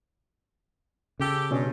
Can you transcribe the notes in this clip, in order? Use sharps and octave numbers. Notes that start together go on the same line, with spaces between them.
C#3 G4 A4
G2 B2 C#4